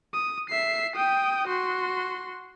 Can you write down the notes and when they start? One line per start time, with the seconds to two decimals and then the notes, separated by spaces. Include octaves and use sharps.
0.13 D#6
0.50 E5 C7
0.96 G5 D#6
1.48 F#4 C6